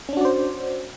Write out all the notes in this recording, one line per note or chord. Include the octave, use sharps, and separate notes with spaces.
C#4 D4 F#4 C5 D5